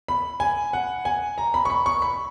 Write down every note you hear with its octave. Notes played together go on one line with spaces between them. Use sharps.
B5
G#5
F#5
G#5
A#5
B5
C#6
B5
C#6
B5